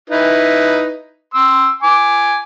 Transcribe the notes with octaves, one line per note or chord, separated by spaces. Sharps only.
D#4 E4 B4
C6 E6
G#5 D6